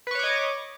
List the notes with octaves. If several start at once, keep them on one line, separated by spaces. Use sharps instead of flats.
B4 C#5 D#5 C#6 D6